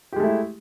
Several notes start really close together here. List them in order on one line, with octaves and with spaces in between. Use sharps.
G4 G#3 A3 E4